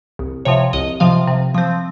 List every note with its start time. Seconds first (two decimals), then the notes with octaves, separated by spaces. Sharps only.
0.19 C2
0.45 C3 F3 C#5
0.73 C2 D#5
1.00 C3 F3 F5
1.27 C3
1.54 F3 C4